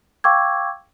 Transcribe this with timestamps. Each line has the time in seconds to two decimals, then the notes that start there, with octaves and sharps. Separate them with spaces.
0.24 F5 G5 C#6 D6 E6 G#6